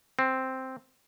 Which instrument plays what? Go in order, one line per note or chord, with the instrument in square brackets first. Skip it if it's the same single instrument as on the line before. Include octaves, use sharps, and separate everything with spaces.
[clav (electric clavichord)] C4